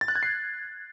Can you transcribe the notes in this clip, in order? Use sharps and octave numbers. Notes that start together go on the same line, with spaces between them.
A6
F#6
G#6
C7